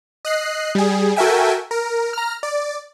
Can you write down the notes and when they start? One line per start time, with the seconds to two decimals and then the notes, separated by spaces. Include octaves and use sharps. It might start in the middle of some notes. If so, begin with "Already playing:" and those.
0.25 D#5 F#6 C7
0.75 G3 G#4
1.16 F#4 A4 A#4 E5 G5 G#5
1.71 A#4
2.13 A#5 F6
2.43 D5